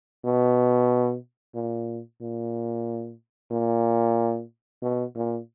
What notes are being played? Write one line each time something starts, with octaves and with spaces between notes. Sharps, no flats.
B2
A#2
A#2
A#2
B2
A#2